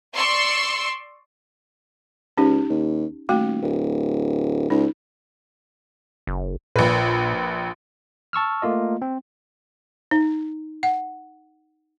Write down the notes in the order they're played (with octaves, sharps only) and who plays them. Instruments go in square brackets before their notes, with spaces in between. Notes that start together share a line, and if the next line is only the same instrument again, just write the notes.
[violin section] D5 C6 C#6 E6
[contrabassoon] C#2 [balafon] C#4 D#4 G4
[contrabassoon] D#2
[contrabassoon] D#1 [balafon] A3 F#4 G5
[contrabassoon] D1
[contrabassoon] C#2 [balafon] D#4
[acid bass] F#1
[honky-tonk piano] A#1 B4 [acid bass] A#2
[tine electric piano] A5 C#6 E6 F6
A3 A#3 F4 D#5
C4
[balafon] D#4
F#5